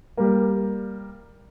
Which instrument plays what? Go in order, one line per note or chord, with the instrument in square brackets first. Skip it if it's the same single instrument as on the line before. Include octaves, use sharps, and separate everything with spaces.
[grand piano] G3 A#3